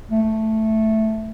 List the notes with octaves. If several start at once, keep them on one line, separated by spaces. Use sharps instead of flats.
A3